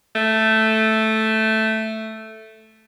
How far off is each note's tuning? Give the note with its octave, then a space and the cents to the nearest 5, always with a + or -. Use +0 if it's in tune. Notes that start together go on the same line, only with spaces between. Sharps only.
A3 +0